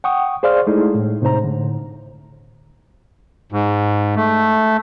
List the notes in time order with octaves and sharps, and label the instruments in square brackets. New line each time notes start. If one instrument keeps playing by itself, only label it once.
[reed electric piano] F#5 G5 C#6 D#6
G#4 C5 D5 F5 C6 F6
G#3 A3 D#4 E4 G#4 A4
A2
A2 C3 D#4 C5 A#5
A2 D3
[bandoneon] G#2
A3